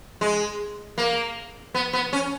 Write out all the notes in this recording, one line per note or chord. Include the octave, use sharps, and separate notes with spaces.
G#3
A#3
B3
B3
C#4